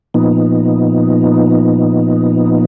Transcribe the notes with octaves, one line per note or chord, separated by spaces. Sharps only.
A#2 F3 B3 D#4